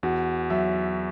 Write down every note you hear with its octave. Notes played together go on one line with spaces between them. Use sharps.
E2 F#4
F#3 E5